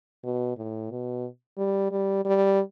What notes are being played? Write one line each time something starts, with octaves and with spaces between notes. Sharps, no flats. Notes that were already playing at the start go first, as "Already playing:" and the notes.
B2
A2
B2
G3
G3
G3